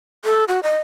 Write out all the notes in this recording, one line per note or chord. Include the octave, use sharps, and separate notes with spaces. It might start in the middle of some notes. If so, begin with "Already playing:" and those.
A4
F#4
D#5